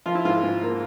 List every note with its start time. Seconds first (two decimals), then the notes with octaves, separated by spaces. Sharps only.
0.06 F3 F4
0.15 E4
0.25 G#2 F4
0.43 G#2
0.62 A#3